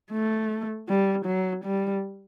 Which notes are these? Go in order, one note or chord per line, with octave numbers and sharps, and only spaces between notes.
A3
G3
F#3
G3